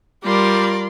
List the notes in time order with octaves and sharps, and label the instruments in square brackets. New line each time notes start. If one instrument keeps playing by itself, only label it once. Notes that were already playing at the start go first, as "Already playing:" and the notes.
[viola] G3 [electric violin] F4 C6 [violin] A#4 D5